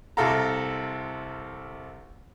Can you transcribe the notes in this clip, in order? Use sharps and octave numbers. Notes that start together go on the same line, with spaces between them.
C2 C3 A4 F5 A#5